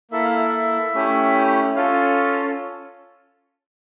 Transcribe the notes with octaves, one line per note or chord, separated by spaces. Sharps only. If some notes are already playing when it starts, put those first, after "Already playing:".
A#3 E4 A4 E5
F5
E5
A3 C#4 E4 G4
C#4 F4 A4 F5